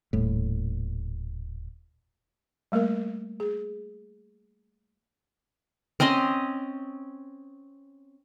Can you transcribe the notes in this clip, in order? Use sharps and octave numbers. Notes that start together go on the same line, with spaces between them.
D#1 A2
G3 A3 A#3 A#4
G#4
C4 C#4 D#5 C6